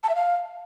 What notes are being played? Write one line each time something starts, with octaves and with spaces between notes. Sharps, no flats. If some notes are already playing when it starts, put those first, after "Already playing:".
A5
E5
F5